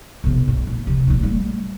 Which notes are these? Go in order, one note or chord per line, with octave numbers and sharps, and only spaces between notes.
B1 C3
G2
A#2
C3 D#3
A#1 D#4
G3 A3